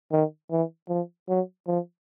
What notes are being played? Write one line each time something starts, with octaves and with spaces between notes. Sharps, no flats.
D#3
E3
F3
F#3
F3